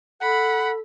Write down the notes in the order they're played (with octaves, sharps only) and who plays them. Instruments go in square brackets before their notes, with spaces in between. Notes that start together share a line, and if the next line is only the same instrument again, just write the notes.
[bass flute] A4 [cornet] F#5 [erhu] B5